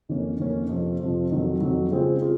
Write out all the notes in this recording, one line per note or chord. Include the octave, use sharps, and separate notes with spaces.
F2 D#3 A#3 C#4
F2 D#3 A#3 C#4
F2 C3 F3
F2 C3 F3
F2 D#3 F#3
F2 D#3 F#3
C#3 G#3 C4 F4 G#4
F4 G#4